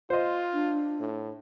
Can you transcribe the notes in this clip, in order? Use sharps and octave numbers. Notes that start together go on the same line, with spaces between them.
F4 C5 D#5
D4
A2